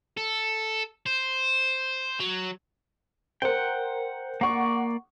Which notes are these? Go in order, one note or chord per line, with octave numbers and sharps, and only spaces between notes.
A4
C5
F#3
A#4 C5 F#5 G5
A#3 D5 F#5 C#6